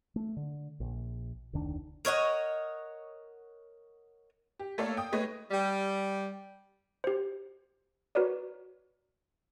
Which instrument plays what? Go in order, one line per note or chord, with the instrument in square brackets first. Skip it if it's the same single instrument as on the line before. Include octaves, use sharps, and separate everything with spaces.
[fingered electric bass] A3
D3
A#1
F1 D2 D#3 D4
[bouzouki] A#4 C#5 D#5 F#5
[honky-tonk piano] G4
A3 A#3 A4 C#5 D5 F5
G5 D#6
G#3 A3 B4 C#5 D#5
[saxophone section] G3
[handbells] G4 C5
F#4 A#4 B4 C#5 D5